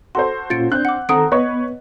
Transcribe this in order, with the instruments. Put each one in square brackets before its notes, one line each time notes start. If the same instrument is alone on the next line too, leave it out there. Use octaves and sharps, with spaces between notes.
[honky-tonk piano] F#4 A4 C5 [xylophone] C6
[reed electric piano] A#2 C#4 F4 [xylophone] A6 C#7 D7
[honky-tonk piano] C4 F#6 [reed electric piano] D4 G6
[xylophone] F#5 D6
[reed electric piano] D#3 A4 A#5 [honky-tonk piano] C4 [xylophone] F#5 D#6 D7
[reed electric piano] B3 [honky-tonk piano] B4 C#5 C#6 [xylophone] D#5